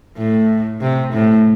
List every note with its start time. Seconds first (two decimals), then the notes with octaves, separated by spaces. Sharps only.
0.17 A2
0.81 C3
1.13 A2